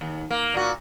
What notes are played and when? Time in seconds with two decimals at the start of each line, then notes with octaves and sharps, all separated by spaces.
0.01 D#2
0.31 A#3
0.54 A#2 F#4